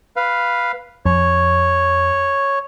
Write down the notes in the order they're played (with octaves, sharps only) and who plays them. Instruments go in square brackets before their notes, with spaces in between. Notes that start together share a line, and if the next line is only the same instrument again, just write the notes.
[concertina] B4 F5
[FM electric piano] F2 [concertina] C#5